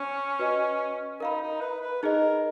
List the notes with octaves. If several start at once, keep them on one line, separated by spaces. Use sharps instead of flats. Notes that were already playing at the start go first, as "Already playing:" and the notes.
Already playing: C#4
F#4 B4 D#5
D#4 A#4 F5 B5
D#4
B4
B4
D#4 G#4 A#4 D#5